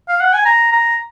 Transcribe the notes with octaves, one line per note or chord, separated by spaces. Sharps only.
F5
F#5
G#5
A#5
A#5